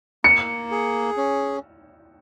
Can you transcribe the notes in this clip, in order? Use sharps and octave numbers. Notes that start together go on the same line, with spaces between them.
A#3 C#7
G#4
C#4